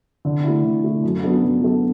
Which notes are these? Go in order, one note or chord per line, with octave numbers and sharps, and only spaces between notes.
D3
A3 E4
D3
A3 E4
F#2
F#3 B3 D4 A4
F#2
F#3 B3 D4 A4